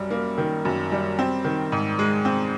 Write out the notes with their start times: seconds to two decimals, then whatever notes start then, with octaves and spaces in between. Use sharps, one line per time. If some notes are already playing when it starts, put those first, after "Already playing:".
Already playing: F#2 G3
0.10 A#3
0.38 D#3
0.65 F#2
0.92 G3
1.19 C4
1.45 D#3
1.72 G#2
1.99 G#3
2.25 C4